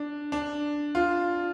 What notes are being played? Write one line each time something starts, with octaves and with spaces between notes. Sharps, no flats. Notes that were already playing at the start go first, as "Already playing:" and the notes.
Already playing: D4
D4
F4